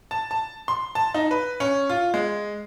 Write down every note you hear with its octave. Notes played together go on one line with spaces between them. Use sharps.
A5
A5
C6
A5
D#4
B4
C#4
F4
G#3